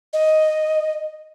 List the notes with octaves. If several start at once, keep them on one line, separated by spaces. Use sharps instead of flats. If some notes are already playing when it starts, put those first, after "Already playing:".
D#5